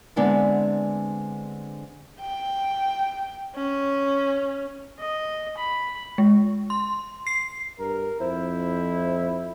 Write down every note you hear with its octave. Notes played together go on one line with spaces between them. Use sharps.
D3 G#3 B3 C4 D4 E4
G5
C#4
D#5
B5
G#3
C6
C7
G2 A#4
F2 E4 C5